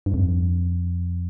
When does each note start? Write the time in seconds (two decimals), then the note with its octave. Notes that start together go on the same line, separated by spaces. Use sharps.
0.06 G2
0.14 F2